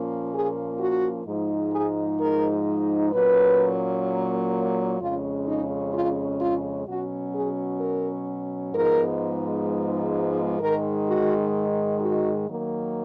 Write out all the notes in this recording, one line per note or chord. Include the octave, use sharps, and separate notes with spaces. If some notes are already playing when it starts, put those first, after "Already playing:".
Already playing: A#2 F3 A#3 C#4
G#4
F#4
G#2 F3 G#3 D#4
G#4
A#4
A#2 F#3 A#3 C#4 B4
F2 C#3 G#3 C#4 F4
D#4
F4
F4
B2 F#3 C#4 F#4
G#4
A#4
G#2 F3 G#3 B3 D#4 A#4
G#2 D#3 G#3 A#4
F#4
F#4
D#3 F#3 A#3